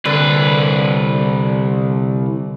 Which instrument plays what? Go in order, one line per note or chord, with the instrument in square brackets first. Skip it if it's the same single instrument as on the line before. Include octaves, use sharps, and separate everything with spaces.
[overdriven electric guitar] C2 B4 [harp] D3